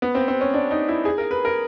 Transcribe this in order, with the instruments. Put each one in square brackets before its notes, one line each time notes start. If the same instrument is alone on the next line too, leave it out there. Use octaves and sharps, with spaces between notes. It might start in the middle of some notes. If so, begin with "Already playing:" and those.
[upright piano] B3
C4
C4
C#4
D4
D#4
E4
G#4
A#4
B4
A#4